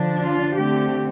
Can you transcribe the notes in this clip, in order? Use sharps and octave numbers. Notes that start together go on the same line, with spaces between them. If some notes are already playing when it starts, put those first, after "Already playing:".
Already playing: D3 F3 D4
F4
D3 A3 C4 G4